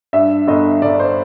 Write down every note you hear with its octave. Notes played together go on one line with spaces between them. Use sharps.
G2 E5
G1 D#5
G1 D5
C5